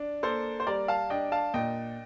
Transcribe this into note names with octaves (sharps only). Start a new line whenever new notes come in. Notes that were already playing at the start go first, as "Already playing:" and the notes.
Already playing: D4
A#3 A4 C5
C5
G3 A#4 D5
F5 A5
D4 D#5 G5
F5 A5
A#2 D#5 G5